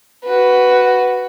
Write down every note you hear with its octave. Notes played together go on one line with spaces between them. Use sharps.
F#4 B4